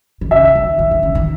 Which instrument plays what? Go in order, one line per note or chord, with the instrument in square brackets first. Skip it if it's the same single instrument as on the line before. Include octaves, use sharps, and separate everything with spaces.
[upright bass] D#3
[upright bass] C#3 [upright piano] E5
[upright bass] D#3
E3
D#3
C#3
D#3